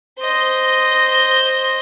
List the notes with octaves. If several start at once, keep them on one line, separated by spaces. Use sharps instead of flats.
C5 D#5